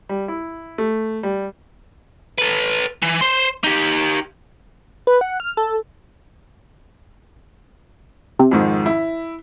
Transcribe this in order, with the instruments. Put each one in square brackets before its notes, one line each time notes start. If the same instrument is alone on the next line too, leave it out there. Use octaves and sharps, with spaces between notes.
[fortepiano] G3
E4
A3
G3
[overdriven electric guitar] A4 B4
E3
C5 C6
D#4 G4
[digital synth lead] B4
F#5
F6
A4
[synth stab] C3
[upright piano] F2 G#2 D#3
E4